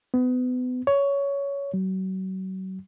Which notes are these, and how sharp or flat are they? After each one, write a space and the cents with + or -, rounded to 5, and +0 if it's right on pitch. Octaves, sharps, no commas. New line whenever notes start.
B3 +30
C#5 +15
F#3 +35